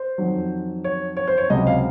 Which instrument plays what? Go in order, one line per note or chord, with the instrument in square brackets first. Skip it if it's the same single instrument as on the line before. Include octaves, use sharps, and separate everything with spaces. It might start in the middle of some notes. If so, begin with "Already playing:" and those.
Already playing: [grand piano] C5
F2 D#3 F#3
C#5
C#5
C5
C#5
C#2 C3 F#3 D#5
F5